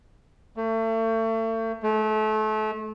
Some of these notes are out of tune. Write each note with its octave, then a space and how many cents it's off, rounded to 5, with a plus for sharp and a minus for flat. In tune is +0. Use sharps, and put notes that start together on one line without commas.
A3 +35
A3 -30